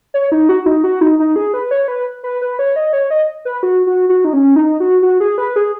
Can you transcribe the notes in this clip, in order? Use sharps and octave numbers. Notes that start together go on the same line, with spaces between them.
C#5
D#4
F#4
D#4
F#4
D#4
D#4
G#4
B4
C#5
B4
B4
B4
C#5
D#5
C#5
D#5
B4
F#4
F#4
F#4
D#4
C#4
D#4
F#4
F#4
G#4
B4
G#4